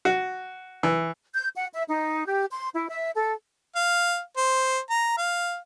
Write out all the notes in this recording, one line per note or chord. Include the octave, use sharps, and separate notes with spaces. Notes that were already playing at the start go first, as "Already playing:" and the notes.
F#4
E3
G6
F#5
E5
D#4
G4
C6
E4
E5
A4
F5
C5
A#5
F5